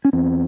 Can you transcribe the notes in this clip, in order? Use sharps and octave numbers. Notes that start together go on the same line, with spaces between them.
C#4
E2 C4